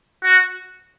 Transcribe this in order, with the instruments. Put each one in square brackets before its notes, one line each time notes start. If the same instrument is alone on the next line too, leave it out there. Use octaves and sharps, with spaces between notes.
[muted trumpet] F#4